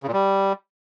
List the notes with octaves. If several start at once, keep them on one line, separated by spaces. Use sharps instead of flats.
C#3
A#2
G3